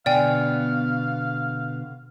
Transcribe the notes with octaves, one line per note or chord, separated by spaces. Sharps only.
B2 D3 B3 D5 F5 G5 G#5